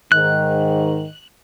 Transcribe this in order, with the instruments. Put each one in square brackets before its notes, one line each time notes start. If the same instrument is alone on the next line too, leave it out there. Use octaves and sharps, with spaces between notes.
[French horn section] G#2 D#3 [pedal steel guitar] F#6